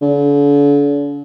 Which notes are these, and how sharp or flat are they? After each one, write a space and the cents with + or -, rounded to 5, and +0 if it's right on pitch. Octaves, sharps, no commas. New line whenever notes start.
D3 -45